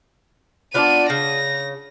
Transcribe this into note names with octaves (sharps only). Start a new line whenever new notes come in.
B3 D4 F4 D5 D#7
C#3 A#6